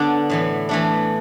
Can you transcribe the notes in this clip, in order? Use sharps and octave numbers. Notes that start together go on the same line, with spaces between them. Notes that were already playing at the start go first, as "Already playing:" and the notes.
Already playing: D3 B3 D4
A2 E3 B3
E3 A3 D4